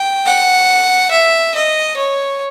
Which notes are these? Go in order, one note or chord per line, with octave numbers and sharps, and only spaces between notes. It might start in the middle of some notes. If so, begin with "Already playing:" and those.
Already playing: G5
F#5
E5
D#5
C#5